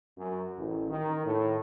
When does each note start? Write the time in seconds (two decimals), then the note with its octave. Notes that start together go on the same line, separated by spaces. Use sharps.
0.18 F#2
0.58 A1
0.90 D#3
1.24 A2